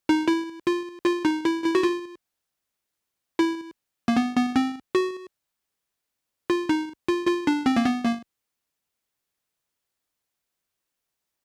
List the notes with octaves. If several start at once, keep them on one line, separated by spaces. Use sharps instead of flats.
D#4
E4
F4
F4
D#4
E4
E4
F#4
F4
E4
A#3
B3
B3
C4
F#4
F4
D#4
F4
F4
D4
C4
A#3
B3
A#3